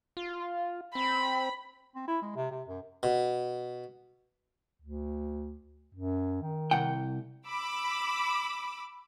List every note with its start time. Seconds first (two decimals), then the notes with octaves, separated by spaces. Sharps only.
0.17 F4
0.95 C4 B5
1.95 C4
2.08 E4
2.22 G#3
2.36 C3
2.51 C3
2.68 F#2
3.03 B2
4.82 D2
5.95 F#2
6.42 D#3
6.71 C2 F#5 G5
7.48 B5 D6 E6